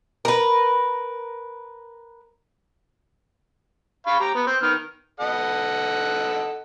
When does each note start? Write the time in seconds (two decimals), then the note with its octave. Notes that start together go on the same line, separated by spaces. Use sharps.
0.25 A#4 B4
4.07 F5 B5 C#6
4.20 G4 A#5
4.35 B3
4.47 C4
4.62 D#3 B3 F6
5.20 A4 D#5 F#5